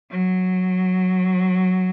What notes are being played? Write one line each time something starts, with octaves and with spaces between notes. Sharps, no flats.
F#3